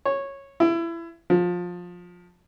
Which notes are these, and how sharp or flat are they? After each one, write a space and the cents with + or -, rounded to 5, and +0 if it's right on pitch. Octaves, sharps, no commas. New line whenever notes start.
C#5 -10
E4 +25
F3 +20